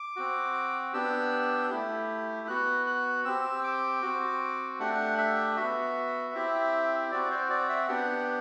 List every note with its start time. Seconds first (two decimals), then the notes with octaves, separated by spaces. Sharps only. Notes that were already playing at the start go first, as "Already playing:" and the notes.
Already playing: D6
0.16 C4 F#4
0.93 B3 D4 G4 E6
1.70 A3 E4 G4
2.48 B3 F#4 F#6
2.87 F#6
3.25 C4 G4 E6
3.64 D6
4.02 C4 F#4
4.79 A3 D4 G4 F#5
5.18 E5
5.56 B3 F#4 E5
6.34 C4 E4 G4
7.11 C4 F#4 D5
7.31 C5
7.50 D5
7.69 E5
7.88 B3 D4 G4 F#5